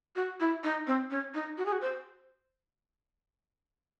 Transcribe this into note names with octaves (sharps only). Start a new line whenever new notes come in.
F#4
E4
D#4
C4
C#4
D#4
F#4
G#4
F#4
C5